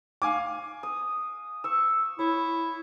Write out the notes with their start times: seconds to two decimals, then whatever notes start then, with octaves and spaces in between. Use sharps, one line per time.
0.22 F5 G#5 D6
0.83 D#6
1.64 C#6 E6
2.19 E4 C#5